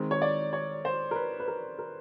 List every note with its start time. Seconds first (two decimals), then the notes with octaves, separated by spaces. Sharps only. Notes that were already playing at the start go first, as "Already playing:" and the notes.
Already playing: D#3 G#3 C4
0.11 C#5
0.22 D5
0.53 C#5
0.85 C5
1.11 A#4
1.16 B4
1.40 B4
1.48 A#4
1.79 A#4